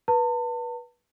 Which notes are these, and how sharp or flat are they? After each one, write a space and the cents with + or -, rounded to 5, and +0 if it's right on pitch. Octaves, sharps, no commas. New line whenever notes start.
B4 -20 A5 +40